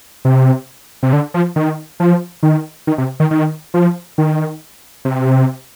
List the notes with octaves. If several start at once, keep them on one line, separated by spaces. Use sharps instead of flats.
C3
C3
D3
F3
D#3
F3
D#3
D#3
C3
D#3
D#3
F3
D#3
C3